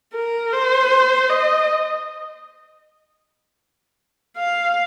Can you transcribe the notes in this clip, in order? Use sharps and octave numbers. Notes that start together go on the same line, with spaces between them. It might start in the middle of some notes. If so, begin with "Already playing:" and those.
A#4
C5
D#5
F5